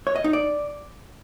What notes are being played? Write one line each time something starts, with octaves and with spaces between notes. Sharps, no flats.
C#5
D#5
D#4
D5